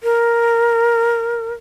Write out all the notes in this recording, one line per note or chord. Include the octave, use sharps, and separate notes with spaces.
A#4